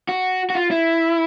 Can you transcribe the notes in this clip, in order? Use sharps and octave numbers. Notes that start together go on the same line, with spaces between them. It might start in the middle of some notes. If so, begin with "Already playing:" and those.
F#4
F#4
F4
E4